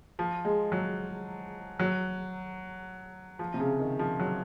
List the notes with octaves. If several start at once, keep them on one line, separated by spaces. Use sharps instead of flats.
F3
G#3
F#3
F#3
F3
C3
C#3
D#3
F3
F#3